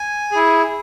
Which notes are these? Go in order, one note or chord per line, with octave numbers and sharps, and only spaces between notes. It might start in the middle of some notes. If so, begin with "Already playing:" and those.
Already playing: G#5
E4 G#4